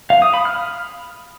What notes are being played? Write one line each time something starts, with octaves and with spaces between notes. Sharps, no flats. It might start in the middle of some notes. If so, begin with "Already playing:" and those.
F5
D#6
B5
F6